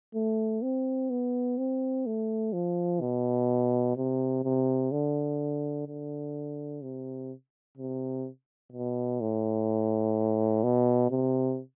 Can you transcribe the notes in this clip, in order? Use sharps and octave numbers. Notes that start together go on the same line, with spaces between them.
A3
C4
B3
C4
A3
F3
B2
C3
C3
D3
D3
C3
C3
B2
A2
B2
C3